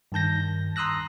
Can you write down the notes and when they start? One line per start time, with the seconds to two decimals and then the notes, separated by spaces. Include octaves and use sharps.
0.12 G2 D#3 A5 G6 A#6
0.76 A#5 C6 D#6 E6 F#6 A#6